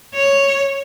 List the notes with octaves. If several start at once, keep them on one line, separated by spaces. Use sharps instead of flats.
C#5